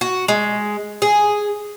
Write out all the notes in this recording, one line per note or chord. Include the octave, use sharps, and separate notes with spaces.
F#4
G#3
G#4